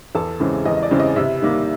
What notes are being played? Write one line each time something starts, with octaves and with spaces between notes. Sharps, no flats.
E2 A4 A5
C#3 E3 G#3 C4
E2 D#5
D#5
D5
C#3 E3 G#3 C4
D#5
C3 E4 E5
D#3 G3 A#3